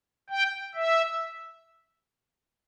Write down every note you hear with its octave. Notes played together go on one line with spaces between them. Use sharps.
G5
E5